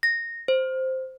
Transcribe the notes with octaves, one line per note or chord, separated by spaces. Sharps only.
A#6
C5